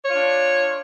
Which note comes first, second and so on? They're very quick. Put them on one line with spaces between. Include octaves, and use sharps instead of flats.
C#5 F4 D4